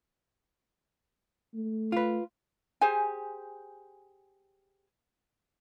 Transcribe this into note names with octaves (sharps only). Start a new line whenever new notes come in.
A3
F4 B4
G4 G#4 C5 G#5